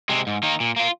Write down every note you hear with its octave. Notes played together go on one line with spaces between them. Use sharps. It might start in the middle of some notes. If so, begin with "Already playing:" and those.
C3 G#3 C4
G#2
D#3 A#3 D#4
A#2
A#3 F4